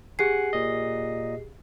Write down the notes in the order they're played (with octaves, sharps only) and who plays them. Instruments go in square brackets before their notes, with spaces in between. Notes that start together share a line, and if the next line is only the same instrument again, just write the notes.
[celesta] G4 G#4 C7 [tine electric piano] F#5 G#5
[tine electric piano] A#2 D#5